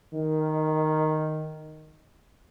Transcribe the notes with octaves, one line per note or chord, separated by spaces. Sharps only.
D#3